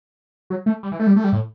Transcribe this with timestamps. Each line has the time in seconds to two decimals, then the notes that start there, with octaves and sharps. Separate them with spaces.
0.50 F#3
0.66 A3
0.83 G3
0.92 E3
0.99 A3
1.07 G3
1.16 A3
1.24 G3
1.32 A2